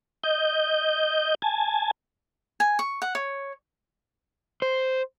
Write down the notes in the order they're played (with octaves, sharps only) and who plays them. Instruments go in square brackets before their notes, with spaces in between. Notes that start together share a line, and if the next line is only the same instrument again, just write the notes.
[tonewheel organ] D#5 G6
G#5 A5
[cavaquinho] G#5
C#6
F#5
C#5
[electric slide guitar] C5